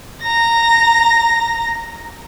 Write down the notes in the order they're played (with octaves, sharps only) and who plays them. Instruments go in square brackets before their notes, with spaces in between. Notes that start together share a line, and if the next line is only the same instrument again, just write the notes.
[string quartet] A#5 A#6